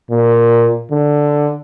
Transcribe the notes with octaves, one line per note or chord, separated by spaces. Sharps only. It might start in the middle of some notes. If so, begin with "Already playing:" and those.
A#2
D3